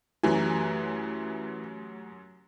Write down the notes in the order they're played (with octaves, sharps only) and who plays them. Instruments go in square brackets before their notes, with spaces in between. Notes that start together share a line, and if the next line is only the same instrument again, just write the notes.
[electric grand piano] F#2 F#3 G#5 [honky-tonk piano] E3 [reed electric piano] A3 G4 A#5